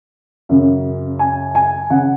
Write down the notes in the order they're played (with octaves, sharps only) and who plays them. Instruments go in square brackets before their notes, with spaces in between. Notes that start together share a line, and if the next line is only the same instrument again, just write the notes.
[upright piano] F#2 C#3
G#5
G#5
C#3 F#5